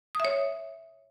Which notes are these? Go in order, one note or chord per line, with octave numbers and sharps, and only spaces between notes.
C#5 E5 D#6